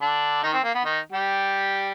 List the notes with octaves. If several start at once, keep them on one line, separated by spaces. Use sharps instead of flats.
D3 D4
D#3 D#4
C4
A#3
B3
D#3 D#4
G3 G4